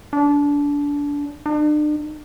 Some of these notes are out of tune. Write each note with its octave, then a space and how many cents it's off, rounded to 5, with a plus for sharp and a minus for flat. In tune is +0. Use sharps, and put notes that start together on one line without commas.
D4 -25
D4 +40